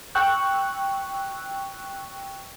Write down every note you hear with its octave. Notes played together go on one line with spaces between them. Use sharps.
G5 C#6 E6 F#6